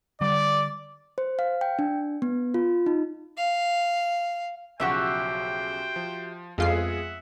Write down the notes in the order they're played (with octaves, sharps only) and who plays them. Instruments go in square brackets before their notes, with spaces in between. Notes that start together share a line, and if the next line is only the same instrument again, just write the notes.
[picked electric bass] D3 G3 [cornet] D5 [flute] D6
[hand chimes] C5
F5
G5
D4
B3
F4
D#4
[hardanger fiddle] F5
[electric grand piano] B1 C#3 F3 [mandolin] F#4 G4 E5 [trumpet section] C5 G5
[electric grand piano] F3
[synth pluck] F2 F4 C7 [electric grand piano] G#3 B3 G#4 [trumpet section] E5 F#5